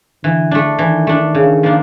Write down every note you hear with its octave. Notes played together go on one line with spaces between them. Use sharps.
D3 E3
A3 D4
D#3 E3
A3 D4
C#3
F3 A#3 D4 F4